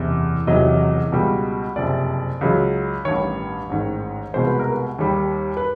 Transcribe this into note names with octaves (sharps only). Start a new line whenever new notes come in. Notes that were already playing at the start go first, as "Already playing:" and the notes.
Already playing: F#1 E2 C3
E1 E2 C3 D#3 F#3 D#5
C#2 B2 G3
F#1 F2 C3 D5
C#2 C#3 F#3
A1 G2 D#3 C#5
A1 G#2 D#3
C2 B2 G#3 C5
B4
A#4
B4
D#2 D#3 G3
B4